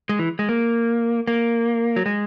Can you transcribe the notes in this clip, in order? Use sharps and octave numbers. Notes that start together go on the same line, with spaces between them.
G#3
E3
G#3
A#3
A#3
F#3
G#3